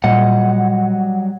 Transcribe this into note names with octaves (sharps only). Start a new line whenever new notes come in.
A#2 F#3 G3 D#5 F#5